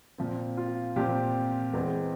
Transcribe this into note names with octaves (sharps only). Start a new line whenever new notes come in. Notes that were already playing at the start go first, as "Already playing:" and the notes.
A#2 F3 C4
F4
A#2 F3 C4 G4
E2 E3 G#3 C4